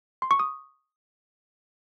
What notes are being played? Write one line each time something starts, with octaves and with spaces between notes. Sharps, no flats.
C6
C#6
D#6